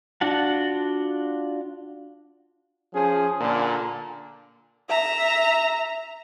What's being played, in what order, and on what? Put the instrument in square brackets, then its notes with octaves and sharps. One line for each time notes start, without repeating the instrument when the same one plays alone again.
[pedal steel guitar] D4 F4 F#4 F#5 A5
[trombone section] F3 C#4 G#4
A#2 D3
[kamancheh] E5 A#5